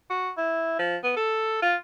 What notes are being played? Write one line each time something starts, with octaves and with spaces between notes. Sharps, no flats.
F#4
E4
F3
B3
A4
F4